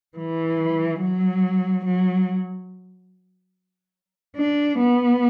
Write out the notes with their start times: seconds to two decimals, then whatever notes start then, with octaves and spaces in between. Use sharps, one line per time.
0.18 E3
1.02 F#3
1.85 F#3
4.37 D4
4.79 B3